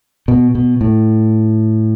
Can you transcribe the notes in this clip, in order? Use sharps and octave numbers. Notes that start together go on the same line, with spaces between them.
B2
B2
A2